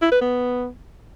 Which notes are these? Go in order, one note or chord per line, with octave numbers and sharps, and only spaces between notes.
E4
B4
B3